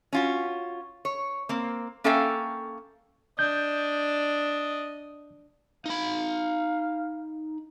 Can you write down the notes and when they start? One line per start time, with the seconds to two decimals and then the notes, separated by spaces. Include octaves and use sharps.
0.13 C#4 F4 F#4
1.05 C#5
1.49 A#3 C4
2.04 A#3 C#4 A4 E5 F5 G5
3.39 D4 D#5 G6
5.86 D#4 F5 B5